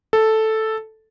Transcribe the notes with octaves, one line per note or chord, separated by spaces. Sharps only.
A4